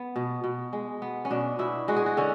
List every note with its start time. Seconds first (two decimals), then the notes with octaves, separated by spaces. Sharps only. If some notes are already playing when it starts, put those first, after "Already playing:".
Already playing: B3
0.16 B2
0.44 B2
0.73 G#3
1.02 B3
1.25 C#4
1.30 B2 D4
1.59 B2 E4
1.88 G#3 F#4
1.96 G#4
2.06 F#4
2.17 D3 C#4